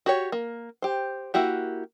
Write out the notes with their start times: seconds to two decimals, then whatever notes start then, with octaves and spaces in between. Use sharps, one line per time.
0.06 F#4 G4 C#5
0.32 A#3
0.82 G4 C5
1.34 A#3 E4 F#4 G4